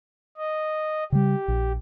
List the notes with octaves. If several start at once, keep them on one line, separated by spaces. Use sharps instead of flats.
D#5
C#3 G3 G4
A#1